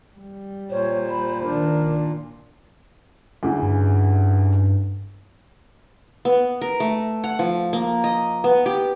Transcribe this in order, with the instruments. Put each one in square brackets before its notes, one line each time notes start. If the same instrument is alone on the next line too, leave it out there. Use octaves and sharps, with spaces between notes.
[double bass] G3
[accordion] A#2 [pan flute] C5 [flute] C#5
[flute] B5
[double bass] D#3 D4 [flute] A#4
[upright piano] D2 C#3 E3
[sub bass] G2
[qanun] B3
A#4
A3
F#5
F3
A#3
D#5
B3
G4